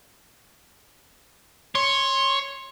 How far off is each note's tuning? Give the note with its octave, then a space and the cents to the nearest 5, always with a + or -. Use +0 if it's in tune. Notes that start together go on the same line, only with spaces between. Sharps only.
C#5 +0 C6 +20